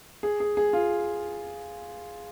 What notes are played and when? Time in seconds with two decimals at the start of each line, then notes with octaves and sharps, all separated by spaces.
0.23 G#4
0.40 G#4
0.57 G#4
0.73 F4